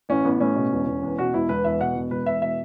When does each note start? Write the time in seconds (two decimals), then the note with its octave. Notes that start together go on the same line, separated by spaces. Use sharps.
0.09 A1 C#4
0.25 A1 B3
0.40 A2 C#4
0.56 B2
0.72 E1
0.87 E1
1.03 E2
1.18 B2 F#4
1.34 E1 E4
1.49 E1 B4
1.64 E2 E5
1.80 B2 F#5
1.96 E1
2.11 E1 B4
2.26 E2 E5
2.42 B2 E5